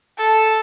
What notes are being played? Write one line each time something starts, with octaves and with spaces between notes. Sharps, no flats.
A4